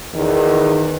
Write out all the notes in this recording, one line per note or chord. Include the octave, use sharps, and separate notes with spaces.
E2 D#3